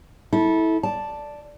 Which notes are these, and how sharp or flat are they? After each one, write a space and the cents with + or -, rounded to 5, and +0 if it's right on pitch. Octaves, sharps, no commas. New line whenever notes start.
E4 -25 A4 -10
D5 +0 A5 +0